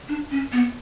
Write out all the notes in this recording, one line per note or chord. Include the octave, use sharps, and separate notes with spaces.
D4
C#4
B3